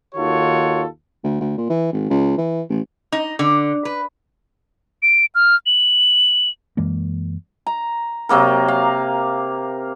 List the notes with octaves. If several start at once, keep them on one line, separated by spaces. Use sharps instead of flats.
D#2 D#3 F4 F#4 A4 C#5
D2
D2
A#2
E3
G#1
C#2
E3
A1
D#4
D3
B4
D7
F6
F#7
F#2 E3 G#3 A#3
A#5
C3 F#3 A#3 A#4
F5